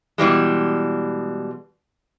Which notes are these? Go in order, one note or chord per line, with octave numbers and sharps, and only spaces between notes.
B2 E3 G3 G#3